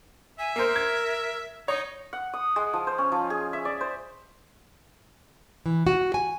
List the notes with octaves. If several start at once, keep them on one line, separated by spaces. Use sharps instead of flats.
E5 G#5
A#3 A#4 C5
G#6
D#4 C#5 D#6
F#5
D#6
G#3
F3
C5
C#4
F3
G#4
E5
D5
C5
E3
F#4
G#5